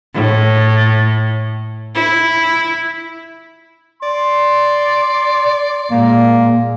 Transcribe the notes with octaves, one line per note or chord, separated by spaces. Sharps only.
A2
E4
D5 C6
A#2 G#3 A#3